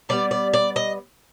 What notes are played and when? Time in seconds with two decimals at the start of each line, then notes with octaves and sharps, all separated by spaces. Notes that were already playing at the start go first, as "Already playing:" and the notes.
0.09 D3 G3 B3 D5
0.31 D5
0.53 D5
0.76 D#5